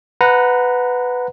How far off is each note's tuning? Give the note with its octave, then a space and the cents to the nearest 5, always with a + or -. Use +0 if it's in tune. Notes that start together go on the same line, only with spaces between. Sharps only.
B4 +10 F#5 -10 A#5 +0